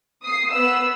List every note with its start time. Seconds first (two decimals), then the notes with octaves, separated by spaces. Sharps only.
0.23 D#6 C7
0.52 B3 B4 E6